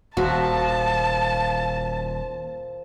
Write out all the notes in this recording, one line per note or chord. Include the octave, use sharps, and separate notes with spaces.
D#1 F3 F#4 A#4 E5 A5